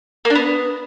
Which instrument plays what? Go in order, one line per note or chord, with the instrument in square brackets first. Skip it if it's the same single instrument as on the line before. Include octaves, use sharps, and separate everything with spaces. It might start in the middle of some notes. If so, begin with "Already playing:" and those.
[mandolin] A#3
D4
B3